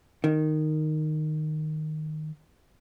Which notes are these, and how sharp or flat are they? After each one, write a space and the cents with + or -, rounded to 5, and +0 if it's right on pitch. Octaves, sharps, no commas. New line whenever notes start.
D#3 -10